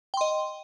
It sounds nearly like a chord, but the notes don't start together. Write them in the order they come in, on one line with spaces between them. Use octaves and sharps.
G5 C6 D#5